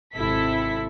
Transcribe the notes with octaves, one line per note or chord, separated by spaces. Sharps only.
G#1 C3 E4 A4 B6